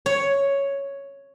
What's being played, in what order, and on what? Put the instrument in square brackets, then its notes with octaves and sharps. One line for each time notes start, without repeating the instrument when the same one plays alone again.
[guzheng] C#5